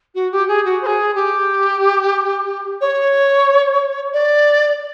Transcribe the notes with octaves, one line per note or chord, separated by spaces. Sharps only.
F#4
G4
G#4
F#4
C5
G#4
G4
C#5
D5